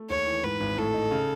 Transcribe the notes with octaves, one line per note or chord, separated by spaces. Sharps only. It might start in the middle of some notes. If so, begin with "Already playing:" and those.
Already playing: A3
D#2 C#5
E3
G#2 B4
G#1
A2 A4
D#4
C#3